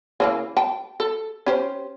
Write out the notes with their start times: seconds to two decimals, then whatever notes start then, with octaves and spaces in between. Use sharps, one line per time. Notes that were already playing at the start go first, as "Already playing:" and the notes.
0.20 C#3 E3 A#3
0.57 G5 A5
1.00 A4
1.46 C#4 G4 C5